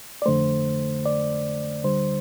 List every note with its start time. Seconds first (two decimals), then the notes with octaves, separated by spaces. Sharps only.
0.22 D5
0.26 F2 D3 A3 C5
1.06 D5
1.84 D2 D3 G3 C5